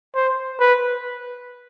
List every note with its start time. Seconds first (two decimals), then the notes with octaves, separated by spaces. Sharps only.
0.15 C5
0.60 B4